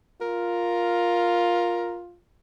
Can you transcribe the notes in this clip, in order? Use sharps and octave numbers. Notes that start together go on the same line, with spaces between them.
F4 A#4